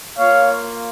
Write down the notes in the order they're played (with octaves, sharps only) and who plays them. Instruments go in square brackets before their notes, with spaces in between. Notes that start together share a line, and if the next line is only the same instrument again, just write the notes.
[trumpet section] A#3 F4 C#5 F5